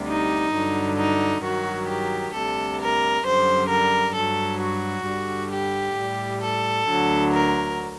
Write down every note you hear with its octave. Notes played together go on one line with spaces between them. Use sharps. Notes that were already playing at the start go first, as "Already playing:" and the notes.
Already playing: D2 C3 G3
D#4
G2 D3 F#3
D#4
G2 D#3 F#3 F#4
G4
D2 C3 G3 A4
A#4
F#2 D3 G3 C5
A#4
G2 F#3 A4
F#4
G2 D3 G3
G4
A2 G3
A4
D2 D3 F#3
A#4